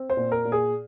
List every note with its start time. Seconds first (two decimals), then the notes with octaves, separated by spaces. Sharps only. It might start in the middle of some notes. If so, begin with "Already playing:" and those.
Already playing: C4
0.10 C5
0.17 A#2
0.32 A#4
0.45 A#2
0.52 G#4